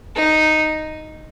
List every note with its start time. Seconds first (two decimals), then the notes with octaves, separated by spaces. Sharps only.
0.15 D#4